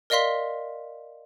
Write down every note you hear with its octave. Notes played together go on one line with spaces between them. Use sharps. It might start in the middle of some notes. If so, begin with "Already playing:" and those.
A#4 D5 D#5 F5 C6 B6